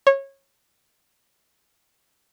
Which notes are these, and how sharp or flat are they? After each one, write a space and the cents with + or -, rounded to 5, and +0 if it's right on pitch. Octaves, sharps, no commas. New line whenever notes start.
C#5 -20